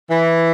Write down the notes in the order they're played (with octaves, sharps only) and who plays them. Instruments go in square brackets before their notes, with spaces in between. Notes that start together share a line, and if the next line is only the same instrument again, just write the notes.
[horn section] E3